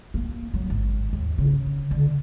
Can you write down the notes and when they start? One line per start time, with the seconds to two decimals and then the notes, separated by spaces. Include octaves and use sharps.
0.14 A#3
0.54 F#3
0.70 G#1
1.13 D#2
1.38 C#3
1.91 D3